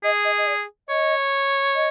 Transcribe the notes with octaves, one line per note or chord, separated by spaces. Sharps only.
G#4 D#5
D#5
D#5
D5
C#5 D#5
D#5